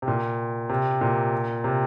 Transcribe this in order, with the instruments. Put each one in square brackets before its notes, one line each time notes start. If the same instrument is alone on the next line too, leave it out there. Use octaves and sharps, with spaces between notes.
[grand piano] C3
A#2
C3
A#2
C3